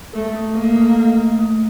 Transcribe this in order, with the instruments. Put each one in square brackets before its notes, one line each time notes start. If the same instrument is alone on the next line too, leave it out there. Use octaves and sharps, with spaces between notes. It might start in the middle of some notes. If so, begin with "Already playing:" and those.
[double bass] A3 [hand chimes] A4
[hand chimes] A3
[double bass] A#3 [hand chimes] A4
[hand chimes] A3
A3
A3
A3